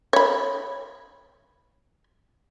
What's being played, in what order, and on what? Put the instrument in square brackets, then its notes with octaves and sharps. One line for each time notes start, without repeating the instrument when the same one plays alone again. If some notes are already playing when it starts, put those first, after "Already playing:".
[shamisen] C#5 B5